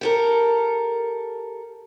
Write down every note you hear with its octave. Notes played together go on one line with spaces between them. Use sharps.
G4 A4 A#4